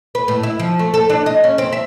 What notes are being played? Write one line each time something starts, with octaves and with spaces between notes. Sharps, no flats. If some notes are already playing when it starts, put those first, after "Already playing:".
B4
A2
E4
F3
A3
A4
D4
D#5
C#4
C4
E5